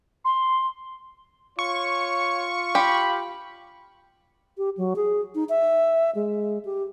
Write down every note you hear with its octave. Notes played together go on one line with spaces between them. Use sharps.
C6
F4 C#5 C#6
G4 B5
G4
F#3
G#4
D#4
E5
G#3
G4